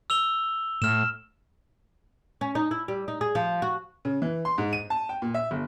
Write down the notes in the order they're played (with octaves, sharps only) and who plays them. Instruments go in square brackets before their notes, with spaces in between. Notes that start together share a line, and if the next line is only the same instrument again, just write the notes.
[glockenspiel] E6 F7 G7
[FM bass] A2 [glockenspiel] F6 E7
[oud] C#4
D#4
E4
G3
D#4
G#4
F3
F#4
[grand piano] C#3
E3
C6
G#2
D#7
A5
G5
A#2
E5
G1